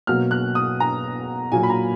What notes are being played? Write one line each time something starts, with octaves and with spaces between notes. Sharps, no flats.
B2 F#3 A#3 F6
F#6
D#6
A#5
A#2 F#3 A#3 G#5
B5
A#5